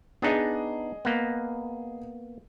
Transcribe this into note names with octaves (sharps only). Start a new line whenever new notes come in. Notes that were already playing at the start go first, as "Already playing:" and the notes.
B3 D4 D#4 G#4 D#5
A#3 B3